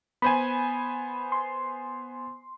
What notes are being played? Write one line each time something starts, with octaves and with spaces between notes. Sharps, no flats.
B3 C5 G#5 B5
C6